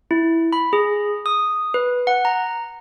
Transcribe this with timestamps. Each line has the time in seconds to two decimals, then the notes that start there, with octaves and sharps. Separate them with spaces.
0.11 E4
0.53 B5
0.73 G#4
1.26 D#6
1.74 B4
2.07 F#5
2.25 A#5